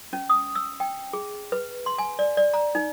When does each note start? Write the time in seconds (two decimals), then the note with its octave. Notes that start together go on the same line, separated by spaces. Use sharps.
0.13 C#4
0.29 D#6
0.55 E6
0.80 G5
1.13 G#4
1.52 B4
1.86 C6
1.98 G#5
2.19 D5
2.37 D5
2.54 A#5
2.75 D#4